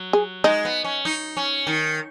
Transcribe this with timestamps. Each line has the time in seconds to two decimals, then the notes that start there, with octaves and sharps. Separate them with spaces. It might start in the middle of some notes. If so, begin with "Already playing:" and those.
Already playing: F#3
0.13 G#4
0.44 G#3 D#4
0.65 B3
0.84 C#4
1.05 D#4
1.37 C#4
1.67 D#3